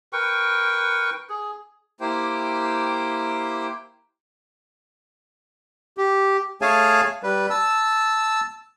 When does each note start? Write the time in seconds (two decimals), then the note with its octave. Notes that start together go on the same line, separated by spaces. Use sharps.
0.13 A#4 B4 G5 C#6
1.30 G#4
2.01 A#3 E4 G4 C5 G5
5.98 G4
6.62 A3 G#4 C#5 F5 G#5 A5
7.23 G3 B4
7.50 A5 E6